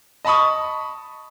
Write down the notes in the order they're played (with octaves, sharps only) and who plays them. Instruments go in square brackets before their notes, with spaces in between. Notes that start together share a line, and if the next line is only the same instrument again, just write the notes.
[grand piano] D#5 A5 B5 C#6 D#6